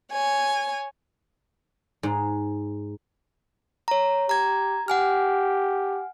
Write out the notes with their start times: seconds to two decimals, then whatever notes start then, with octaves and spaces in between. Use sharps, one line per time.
0.12 C#5 G#5
2.03 G#2
3.88 C#5 A#5
4.29 G4 A#5 G#6
4.88 G4 F#5 G#5 F6